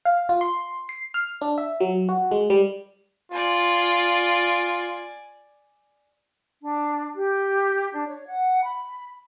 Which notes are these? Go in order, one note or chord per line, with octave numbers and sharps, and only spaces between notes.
F5
F4
C6
C7
F6
D4
E5
F#3
F#4
G#3
G3
F4 D5 G#5
D4
G4
D4
C#5
F#5
B5